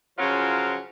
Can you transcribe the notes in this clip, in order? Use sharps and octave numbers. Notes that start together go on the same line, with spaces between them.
C#3 F3 F#3 C#4 F4 A#4